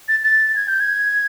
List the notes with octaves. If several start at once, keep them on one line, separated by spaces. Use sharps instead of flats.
A6
A6
G#6
G6
G#6